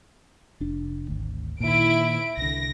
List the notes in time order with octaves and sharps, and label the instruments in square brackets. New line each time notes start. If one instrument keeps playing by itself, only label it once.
[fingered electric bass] F1 D4
G#1 D2
[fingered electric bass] A#2 D#3 [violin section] E4 D7
[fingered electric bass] C2 D3 [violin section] A#6